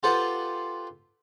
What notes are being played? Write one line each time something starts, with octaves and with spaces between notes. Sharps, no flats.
F4 G4 A4 B4 C5 F#5